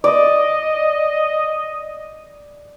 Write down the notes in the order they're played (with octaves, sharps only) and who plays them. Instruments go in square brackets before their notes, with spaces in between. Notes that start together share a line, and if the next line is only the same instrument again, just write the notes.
[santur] D5 [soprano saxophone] D#5